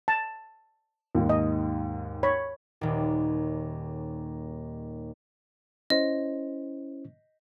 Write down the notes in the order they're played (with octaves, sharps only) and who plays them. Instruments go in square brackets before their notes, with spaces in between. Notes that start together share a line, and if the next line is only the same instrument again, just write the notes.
[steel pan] A5
[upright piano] D#2 G#2
[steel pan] D#5
C#5 B5
[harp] D#1 D#2
[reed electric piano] C#4 E4 C5 [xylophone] D#5